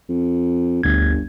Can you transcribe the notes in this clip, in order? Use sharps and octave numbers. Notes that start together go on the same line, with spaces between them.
F2
G1 D2 G#6